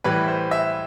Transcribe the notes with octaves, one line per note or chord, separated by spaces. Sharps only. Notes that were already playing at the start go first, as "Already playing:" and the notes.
A2 E3 G3 B4
C5
E5